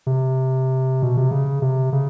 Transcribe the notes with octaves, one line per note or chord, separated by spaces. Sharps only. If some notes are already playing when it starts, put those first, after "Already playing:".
C3
B2
C3
C#3
C3
C#3